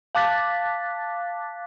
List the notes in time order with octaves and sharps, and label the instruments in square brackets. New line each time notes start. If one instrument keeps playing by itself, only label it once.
[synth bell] F5 A5 D6 F#6 A6 B6